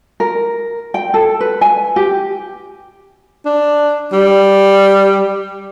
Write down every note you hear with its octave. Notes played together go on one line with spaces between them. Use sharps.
A#4
G5
A4
B4
G#5
G4
D4
G3